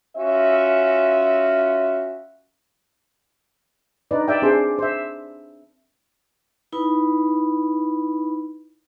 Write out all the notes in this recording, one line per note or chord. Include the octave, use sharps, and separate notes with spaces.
C#4 F4 F#4 E5
D4 D#4 B4 D5
D5 E5 G5
C4 D4 G#4 C5
C5 E5
D#4 E4 B4 B5